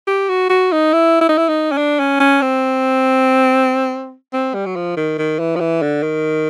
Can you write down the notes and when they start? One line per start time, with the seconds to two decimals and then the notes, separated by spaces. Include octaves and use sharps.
0.07 G4
0.29 F#4
0.50 F#4
0.72 D#4
0.93 E4
1.21 E4
1.29 D#4
1.38 E4
1.49 D#4
1.72 C#4
1.77 D4
2.00 C#4
2.20 C#4
2.42 C4
4.33 C4
4.54 G3
4.66 F#3
4.76 F3
4.97 D#3
5.18 D#3
5.39 E3
5.56 F3
5.60 E3
5.82 D3
6.03 D#3